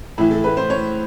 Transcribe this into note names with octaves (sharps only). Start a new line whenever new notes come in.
A2 E3 E4
A4
B4
C5
C#5